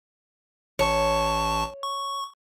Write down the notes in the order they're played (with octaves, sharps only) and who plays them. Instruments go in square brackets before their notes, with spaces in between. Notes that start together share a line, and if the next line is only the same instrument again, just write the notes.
[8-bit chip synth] A1 A5 C#6 [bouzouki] C#5
[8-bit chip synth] C#6